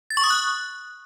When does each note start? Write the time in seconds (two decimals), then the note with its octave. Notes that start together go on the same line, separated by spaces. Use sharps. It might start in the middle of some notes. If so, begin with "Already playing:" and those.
0.10 A6
0.17 C#6
0.24 D#6
0.30 F#6